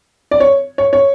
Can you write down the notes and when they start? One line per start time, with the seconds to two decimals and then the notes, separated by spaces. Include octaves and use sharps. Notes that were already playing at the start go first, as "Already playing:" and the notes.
0.31 D5
0.40 C#5
0.78 C#5
0.93 C#5